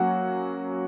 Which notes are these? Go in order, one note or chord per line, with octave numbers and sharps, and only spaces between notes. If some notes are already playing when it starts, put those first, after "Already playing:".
Already playing: F#3 A#3 C#4 F#4 F#5